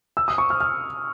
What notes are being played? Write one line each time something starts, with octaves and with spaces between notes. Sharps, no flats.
E6
D#6
C#6
F6
F6